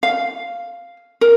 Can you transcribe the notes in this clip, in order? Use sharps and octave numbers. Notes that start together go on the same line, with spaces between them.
F5
A#4